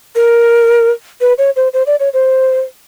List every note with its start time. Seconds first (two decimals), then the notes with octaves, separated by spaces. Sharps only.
0.15 A#4
1.21 B4
1.38 C#5
1.56 C5
1.73 C5
1.86 D5
2.00 C#5
2.14 C5